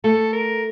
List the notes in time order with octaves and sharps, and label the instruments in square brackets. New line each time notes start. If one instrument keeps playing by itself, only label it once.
[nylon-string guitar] A3 [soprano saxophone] A4
[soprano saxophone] A#4